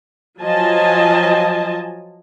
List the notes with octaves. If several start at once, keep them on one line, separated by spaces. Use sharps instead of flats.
F3 F#3 F4 D#5 G#5 A5